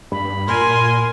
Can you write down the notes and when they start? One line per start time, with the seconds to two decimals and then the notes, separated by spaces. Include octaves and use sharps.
0.12 G2 B5
0.47 A#2 A#4 G#5 C6